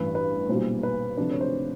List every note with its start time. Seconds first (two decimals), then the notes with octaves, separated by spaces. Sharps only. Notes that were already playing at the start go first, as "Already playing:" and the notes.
Already playing: A1 G2 E3 B4
0.15 B4
0.49 B1 A#2 G3 C5
0.83 B4
1.17 D2 C3 F3 A3 D4 B4
1.31 C#5
1.41 C5